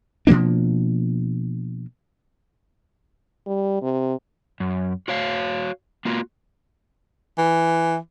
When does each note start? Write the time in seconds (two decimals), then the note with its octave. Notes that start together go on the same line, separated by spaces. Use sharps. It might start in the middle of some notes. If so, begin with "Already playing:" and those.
0.27 B2 F3 A#3 D4
3.47 G3
3.82 C3
4.60 F#2
5.08 F#4 C#5 F5
6.05 A#3 F4 F#4
7.38 E3